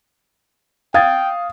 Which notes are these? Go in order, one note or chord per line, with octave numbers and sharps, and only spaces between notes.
F5 G5 D#6 G#6 A6